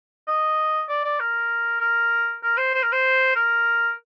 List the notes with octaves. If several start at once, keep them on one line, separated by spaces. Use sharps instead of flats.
D#5
D5
D5
A#4
A#4
A#4
C5
C5
A#4
C5
A#4